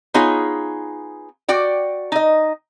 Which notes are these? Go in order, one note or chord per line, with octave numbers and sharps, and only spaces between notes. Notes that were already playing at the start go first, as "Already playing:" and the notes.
B3 D#4 F4 G#4 C#5
F#4 D5 G5
D#4 D#5